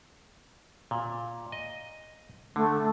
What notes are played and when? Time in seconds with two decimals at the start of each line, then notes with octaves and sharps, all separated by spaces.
0.91 A#2
1.52 D#5
2.56 D3 A3